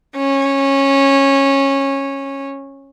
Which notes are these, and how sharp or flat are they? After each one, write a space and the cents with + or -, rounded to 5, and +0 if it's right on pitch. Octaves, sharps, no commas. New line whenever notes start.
C#4 -15